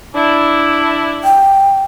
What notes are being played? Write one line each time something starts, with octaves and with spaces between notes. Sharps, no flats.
D4 E4
G5